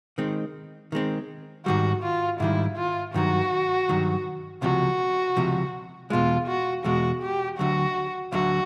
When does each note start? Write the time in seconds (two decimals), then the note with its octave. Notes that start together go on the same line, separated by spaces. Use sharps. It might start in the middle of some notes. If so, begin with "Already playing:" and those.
0.18 D#3 G#3 C4
0.92 D#3 G#3 C4
1.66 G#2 D#3 G3 F#4
2.03 F4
2.40 G#2 D#3 G3 E4
2.77 F4
3.14 G2 D#3 F#3 F#4
3.89 G2 D#3 F#3
4.62 C#2 C3 F3 F#4
5.37 C#2 C3 F3
6.10 E2 B2 G#3 F4
6.48 F#4
6.84 E2 B2 G#3 F#4
7.22 G4
7.59 D2 D3 F#3 F#4
8.32 D2 D3 F#3 F#4